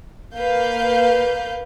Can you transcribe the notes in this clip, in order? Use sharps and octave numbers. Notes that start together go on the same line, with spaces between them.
A#3 B4 F5 G6